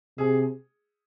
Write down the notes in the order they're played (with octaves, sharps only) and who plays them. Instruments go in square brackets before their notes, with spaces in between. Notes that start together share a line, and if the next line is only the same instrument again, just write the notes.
[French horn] C3 [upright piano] G#4